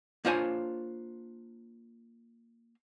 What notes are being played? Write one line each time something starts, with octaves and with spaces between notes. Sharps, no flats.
A#3 D4 F4 C5 C#5 G#5